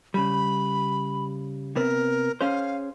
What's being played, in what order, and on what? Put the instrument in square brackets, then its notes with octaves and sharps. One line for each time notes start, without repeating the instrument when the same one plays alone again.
[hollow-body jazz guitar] C#3 G3 [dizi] B5
[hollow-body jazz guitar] C3 B3 C4 [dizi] A#4
[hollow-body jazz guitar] C#4 G#4 C5 [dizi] F5